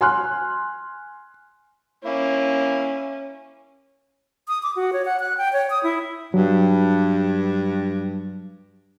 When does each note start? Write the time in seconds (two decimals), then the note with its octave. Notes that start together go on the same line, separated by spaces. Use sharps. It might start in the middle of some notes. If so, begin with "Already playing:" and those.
0.01 G#5 C6 F6 F#6
2.05 A#3 C#4 E4
4.48 D#6
4.63 D6
4.76 F#4
4.93 C#5
5.05 F#5
5.20 F#6
5.38 G5
5.53 C#5
5.70 D#6
5.83 E4
6.34 G2 F#3